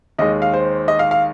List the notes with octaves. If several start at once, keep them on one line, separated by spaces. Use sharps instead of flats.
D#2 D#3 G#3 D#5
F5
C5
D#5
F5
F5